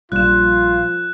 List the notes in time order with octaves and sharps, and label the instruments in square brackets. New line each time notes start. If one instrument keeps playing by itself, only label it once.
[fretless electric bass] A#1 G3 [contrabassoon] F3 [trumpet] F4 [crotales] F#6 E7